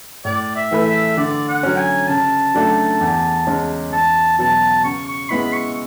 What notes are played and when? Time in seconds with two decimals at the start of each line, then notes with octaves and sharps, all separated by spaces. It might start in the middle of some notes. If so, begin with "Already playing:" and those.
0.25 A2 D5
0.56 E5
0.71 E3 A3 E4 B4
0.86 E5
1.17 D3 D5
1.48 F#5
1.63 F#3 C#4
1.79 G#5
2.08 C#3 A5
2.55 F#3 A3 D4 F#4
3.01 E2
3.47 C#3 G#3 C#4
3.92 E2 A5
4.38 B2 F#3 B3 A5
4.84 C#3 C#6
5.07 C#6
5.30 G#3 B3 E4 B5
5.53 C#6